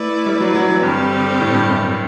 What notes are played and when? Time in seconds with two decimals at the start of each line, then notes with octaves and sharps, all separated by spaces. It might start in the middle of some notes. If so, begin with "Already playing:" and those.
Already playing: A3 E4 B4 D5
0.26 G3
0.40 F#3
0.55 F#3
0.69 E3
0.83 G2 D3 G3 C4 G4
1.41 A2
1.54 G2
1.68 F#2